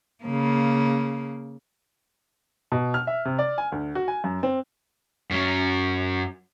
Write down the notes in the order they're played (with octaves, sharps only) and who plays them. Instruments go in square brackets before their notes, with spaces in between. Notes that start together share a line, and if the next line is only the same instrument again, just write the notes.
[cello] C#3 A#3
[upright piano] B2
F6
E5
C3
D5
G#5
D2
F#4
G#5
F#2
C4
[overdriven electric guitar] F#2 F#3